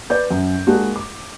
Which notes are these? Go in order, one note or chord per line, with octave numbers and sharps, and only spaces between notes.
B4 D5 G6
F#2
G#3 A#3 D4 F#4
D6